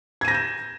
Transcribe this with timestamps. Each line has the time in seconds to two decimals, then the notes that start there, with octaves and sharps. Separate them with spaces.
0.21 G#6
0.25 D#7
0.28 A#6
0.31 G6
0.34 E7